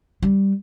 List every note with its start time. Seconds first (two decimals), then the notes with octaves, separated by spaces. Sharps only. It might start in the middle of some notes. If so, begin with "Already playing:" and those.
0.22 G3